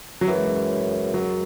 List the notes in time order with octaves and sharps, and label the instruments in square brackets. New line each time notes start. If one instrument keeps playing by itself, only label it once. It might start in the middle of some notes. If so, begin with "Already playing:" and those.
[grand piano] F#3
[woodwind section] F#2 C#3 G#3 [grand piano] E3
[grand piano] F#3